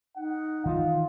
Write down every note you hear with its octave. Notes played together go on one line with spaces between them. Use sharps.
D#4 F#5
D#3 E3 F4